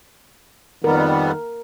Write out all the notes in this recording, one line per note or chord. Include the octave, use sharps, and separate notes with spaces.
F2 D#3 G3 B3 A#4